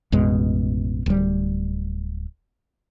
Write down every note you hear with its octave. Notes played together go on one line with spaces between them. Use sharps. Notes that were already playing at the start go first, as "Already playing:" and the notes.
A1 F2 B2 G#3
D1 G3